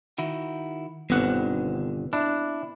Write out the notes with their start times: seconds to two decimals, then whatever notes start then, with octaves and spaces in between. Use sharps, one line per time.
0.18 D#3 E4 F#4
1.10 G1 B2 D3 D#3 B3 C4 F#5
2.13 D4 E4